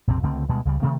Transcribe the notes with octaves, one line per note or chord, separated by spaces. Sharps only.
A#1 F2 C3 C4
C#2 D3 A3 C4
D2 B2 G3 G#3
C#2 C#3 G3
C3 D#3 A3 C4